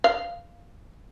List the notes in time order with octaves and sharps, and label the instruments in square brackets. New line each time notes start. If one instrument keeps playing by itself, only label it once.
[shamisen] F5